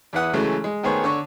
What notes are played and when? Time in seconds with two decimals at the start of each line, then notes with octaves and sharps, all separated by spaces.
0.13 E2 E4 B4 F#5 D#6
0.33 C#3 E3 F#3 G#3 A3 C#4
0.64 G#3
0.83 D#3 A3 B3 G#4 C5 C#5
1.04 D3 C#5 C#6